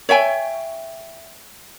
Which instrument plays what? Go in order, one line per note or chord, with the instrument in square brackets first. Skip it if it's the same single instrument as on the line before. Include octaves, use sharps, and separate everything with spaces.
[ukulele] C#5 E5 G5 G#5